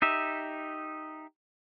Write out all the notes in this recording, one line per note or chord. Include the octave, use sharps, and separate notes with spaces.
D#4 G4 E5